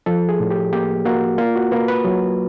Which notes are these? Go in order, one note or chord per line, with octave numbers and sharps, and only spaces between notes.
F3 A4
G#4
A2
G4
A#3 G4
A#3 F#4
A#3 F4
F#4
A#3 B4
B4
F#3